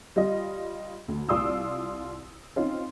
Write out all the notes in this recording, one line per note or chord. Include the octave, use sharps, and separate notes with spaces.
G3 F4 D#5
D2
C2 F4 D5 C6 D#6 E6
C4 C#4 D#4 F4